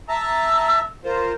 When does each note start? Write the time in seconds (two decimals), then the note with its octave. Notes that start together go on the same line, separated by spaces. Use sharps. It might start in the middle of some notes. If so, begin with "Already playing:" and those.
0.09 E5 A5 A#5 E6
1.04 F4 A#4 C5